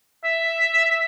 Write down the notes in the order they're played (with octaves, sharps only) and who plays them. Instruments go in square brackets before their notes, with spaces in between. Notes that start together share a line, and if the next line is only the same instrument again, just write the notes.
[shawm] E5